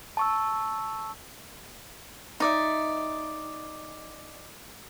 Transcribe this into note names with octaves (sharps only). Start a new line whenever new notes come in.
A5 C#6 E6
D#4 D5 E5